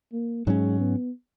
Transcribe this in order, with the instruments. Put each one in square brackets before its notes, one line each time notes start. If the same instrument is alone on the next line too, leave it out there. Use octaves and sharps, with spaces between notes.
[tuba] A#3
[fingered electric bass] G#2 F#3 C#4 [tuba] G#3
[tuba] B3